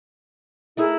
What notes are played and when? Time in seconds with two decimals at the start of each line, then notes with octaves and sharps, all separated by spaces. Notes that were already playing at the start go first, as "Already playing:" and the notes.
0.77 A3 D#4 E4 G#4 A#4